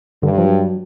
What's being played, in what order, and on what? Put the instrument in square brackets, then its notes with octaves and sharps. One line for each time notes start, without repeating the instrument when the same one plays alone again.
[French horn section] G2 [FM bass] D3
[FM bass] F3
F#3